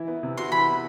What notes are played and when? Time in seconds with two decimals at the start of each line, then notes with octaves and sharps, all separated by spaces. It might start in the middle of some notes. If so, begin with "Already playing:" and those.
Already playing: E3 E4
0.08 B3
0.23 C3
0.38 F#4 C6
0.51 E3 B5
0.67 B3